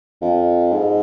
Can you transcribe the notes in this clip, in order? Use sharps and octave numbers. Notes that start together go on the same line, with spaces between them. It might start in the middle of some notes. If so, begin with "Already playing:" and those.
F2
G#2